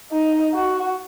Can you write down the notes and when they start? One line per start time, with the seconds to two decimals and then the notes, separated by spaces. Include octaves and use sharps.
0.12 D#4
0.54 F#4